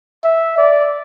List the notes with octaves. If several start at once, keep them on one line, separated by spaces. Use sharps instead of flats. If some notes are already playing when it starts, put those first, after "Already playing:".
E5
D5